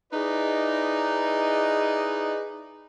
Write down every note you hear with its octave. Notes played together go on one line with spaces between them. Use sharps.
D#4 E4 G#4 B4 D5 D#5